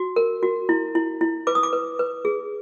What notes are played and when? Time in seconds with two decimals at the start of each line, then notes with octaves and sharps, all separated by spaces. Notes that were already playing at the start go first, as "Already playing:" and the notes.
Already playing: F#4
0.16 A#4
0.43 F#4
0.69 E4
0.95 E4
1.21 E4
1.47 B4 D6
1.55 D#6
1.63 D6
1.73 B4
1.99 B4
2.25 G#4